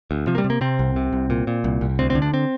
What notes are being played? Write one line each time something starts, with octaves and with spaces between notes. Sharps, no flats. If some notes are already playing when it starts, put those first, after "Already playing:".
D2
C3 F3
A#3
G3
C3
A#3
C3 C4
C2
C3
C2
A#2
A#2
C2
C2
D2 C4
C4
D3
D4
C4